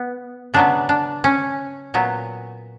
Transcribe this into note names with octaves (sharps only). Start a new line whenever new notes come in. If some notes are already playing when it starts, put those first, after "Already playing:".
Already playing: B3
C#3 F#3 B3 D4
D4
C#4
A#2 F#3 B3